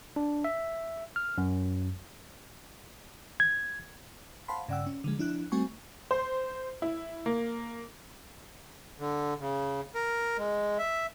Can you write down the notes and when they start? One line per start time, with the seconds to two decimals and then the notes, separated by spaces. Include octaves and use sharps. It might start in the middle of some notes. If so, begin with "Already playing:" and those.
0.16 D4
0.44 E5
1.16 F6
1.38 F#2
3.40 G#6
4.48 C5 F5 F#5 A5 B5 C6
4.68 G2 C#3 D5 F#5 G5 E6
4.87 C#4
5.04 D3 F3 G#3
5.18 F3 D4 E4 F#6
5.52 G3 A3 C4 F#4 G#5 C#6
6.11 C5
6.82 E4
7.26 A#3
8.99 D3
9.40 C#3
9.95 A#4
10.38 G#3
10.78 E5